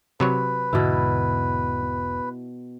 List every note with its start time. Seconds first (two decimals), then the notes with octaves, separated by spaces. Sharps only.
0.20 C3 F#3 B4 C#5
0.73 E1 G#2 B2 D3 E4